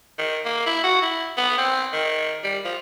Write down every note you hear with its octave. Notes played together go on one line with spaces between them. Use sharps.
D#3
A#3
E4
F#4
E4
B3
C4
D#3
G3
F3